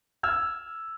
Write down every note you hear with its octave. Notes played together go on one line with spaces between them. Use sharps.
E6 F6 G#6